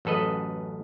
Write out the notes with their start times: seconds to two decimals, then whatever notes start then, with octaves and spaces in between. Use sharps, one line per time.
0.05 A1 F#2 A4 B4 D#5